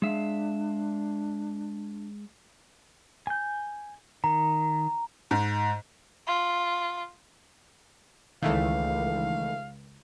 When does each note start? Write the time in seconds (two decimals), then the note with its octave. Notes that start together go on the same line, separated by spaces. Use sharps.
0.02 G#3 D4 E5 F5
3.27 G#5 G6
4.24 D#3 A#5
5.31 G#2
6.27 F4
8.43 C#2 D#3 E3 A3 F5